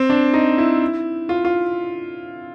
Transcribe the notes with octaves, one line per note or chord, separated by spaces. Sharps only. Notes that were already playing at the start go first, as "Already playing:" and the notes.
Already playing: C4
D4
D#4
E4
F4
F4